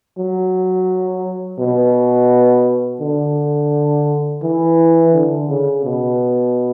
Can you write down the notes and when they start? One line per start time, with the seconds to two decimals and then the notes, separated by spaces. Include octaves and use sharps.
0.18 F#3
1.59 B2
3.01 D3
4.43 E3
5.13 D3
5.49 C#3
5.84 B2